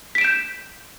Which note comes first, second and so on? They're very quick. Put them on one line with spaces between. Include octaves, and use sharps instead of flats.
B6 D7 E7 G6